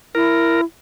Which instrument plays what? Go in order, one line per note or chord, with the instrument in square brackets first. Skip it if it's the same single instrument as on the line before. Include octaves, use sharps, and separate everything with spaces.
[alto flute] E4 [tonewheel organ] A#4